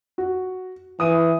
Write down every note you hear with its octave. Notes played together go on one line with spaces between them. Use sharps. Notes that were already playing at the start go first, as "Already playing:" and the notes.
F#4
E3 D#6 D#7